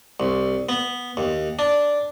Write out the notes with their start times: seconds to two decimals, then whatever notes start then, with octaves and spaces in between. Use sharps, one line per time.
0.20 C2
0.69 B3
1.17 D#2
1.59 D4